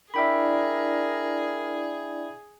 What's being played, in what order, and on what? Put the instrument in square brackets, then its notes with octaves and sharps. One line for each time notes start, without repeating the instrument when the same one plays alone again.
[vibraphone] D4 E4 D5 [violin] G#4 [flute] A#4 [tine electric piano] E5 G5 B5